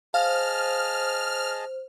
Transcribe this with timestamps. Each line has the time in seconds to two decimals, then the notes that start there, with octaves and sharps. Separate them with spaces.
0.14 G#4 C5 D#5 F5 A5 F6